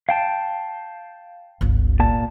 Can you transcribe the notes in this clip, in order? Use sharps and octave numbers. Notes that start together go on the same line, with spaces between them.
F5 G5 A5
G1 C#2
A#2 A5